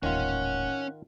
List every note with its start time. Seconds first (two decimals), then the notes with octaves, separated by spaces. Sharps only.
0.03 D#1 A1 D#3 C#4 F4 F#5